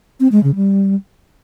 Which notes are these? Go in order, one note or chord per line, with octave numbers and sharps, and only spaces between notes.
C4
G#3
C#3
G3